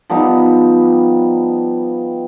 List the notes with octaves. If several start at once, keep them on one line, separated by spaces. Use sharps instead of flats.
F3 G3 B3 D#4